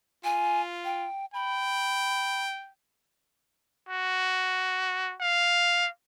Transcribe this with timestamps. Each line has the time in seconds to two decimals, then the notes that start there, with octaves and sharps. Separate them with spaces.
0.24 F4 G#5
0.85 G5
1.34 G5 B5
3.89 F#4
5.21 F5